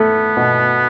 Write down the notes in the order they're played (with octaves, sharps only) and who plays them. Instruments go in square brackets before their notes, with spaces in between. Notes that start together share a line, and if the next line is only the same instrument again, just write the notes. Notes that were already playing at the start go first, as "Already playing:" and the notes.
Already playing: [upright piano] A3 [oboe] B3
[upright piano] B2